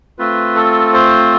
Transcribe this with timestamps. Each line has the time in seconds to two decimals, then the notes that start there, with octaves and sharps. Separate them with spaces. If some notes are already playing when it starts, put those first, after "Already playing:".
0.19 A3 C4 F4 B4
0.56 A4
0.94 C5